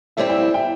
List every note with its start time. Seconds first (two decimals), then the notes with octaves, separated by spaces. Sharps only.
0.17 A2 G3 C4 E4 E5
0.29 G5
0.42 E5
0.54 G5